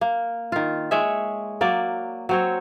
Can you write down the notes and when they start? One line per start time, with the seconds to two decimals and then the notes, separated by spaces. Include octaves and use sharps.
0.01 A#3
0.52 D#3 F4
0.91 G#3 C#5 E5
1.61 F#3 A#3 D5
2.29 F#3 C4 C#5